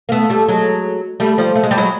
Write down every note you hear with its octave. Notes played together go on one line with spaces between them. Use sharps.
A#3
A3 B3
G3 A3
F#3 G#3
G3 A3
F3 G3
A3
G#3
G3
F#3 G#3